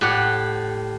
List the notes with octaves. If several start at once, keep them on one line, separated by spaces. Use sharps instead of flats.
A2 G4 F#5